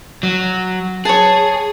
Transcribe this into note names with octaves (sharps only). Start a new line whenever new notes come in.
F#3
G#4 C#5 A5